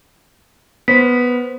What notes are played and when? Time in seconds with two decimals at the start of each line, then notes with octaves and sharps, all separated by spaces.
0.88 B3 C5 B6